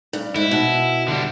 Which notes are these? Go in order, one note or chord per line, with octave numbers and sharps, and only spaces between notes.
G2
G#2 E4
B2
D3 G3